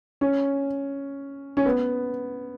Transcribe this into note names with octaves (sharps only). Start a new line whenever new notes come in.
C#4
C#4
B3